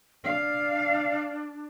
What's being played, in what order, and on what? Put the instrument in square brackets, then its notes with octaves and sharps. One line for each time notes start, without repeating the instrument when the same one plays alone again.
[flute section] D4 D5 [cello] F5